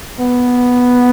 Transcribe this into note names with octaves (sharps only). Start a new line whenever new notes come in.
B3